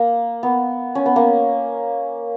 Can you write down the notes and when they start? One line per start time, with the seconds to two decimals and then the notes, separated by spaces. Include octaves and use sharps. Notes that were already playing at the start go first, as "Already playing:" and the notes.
Already playing: A#3
0.43 B3
0.95 C#4
1.06 B3
1.16 A#3